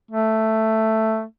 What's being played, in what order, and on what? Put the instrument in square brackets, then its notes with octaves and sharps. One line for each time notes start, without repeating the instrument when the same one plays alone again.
[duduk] A3